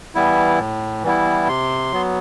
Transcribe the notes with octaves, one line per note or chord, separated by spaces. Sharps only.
E3 G3 B3 E4
A2
E3 G3 B3 E4
C3 C6
F#3 B3